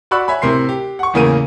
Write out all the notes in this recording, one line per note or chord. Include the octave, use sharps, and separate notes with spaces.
F#4 D5 B5 C#6 E6 F#6
C#5 E5 G#5 B5
A2 C3 A#4 C6 C7
G4
F#5 C#6
E2 A2 C#3 A#3 A#4 D#7